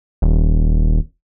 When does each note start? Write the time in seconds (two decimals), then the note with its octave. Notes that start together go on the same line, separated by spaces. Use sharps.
0.22 D#1